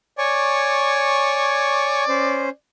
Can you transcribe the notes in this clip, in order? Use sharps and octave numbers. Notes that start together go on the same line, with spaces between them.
C#5 D5 G#5 C#6
C#4 C5